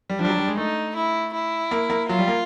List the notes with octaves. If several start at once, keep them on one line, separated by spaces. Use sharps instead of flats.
G3
F3 D4
G3
F#3
G3
G#3
A3 D#4
E4
E4
A#3
A#3
F#3 F4
G3
A#3